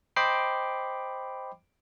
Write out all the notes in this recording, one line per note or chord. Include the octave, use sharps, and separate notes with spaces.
C5 D#5 G5 B5 D6 C7